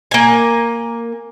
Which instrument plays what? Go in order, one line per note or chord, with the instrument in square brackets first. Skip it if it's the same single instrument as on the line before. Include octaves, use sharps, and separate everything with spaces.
[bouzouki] A#3 G#5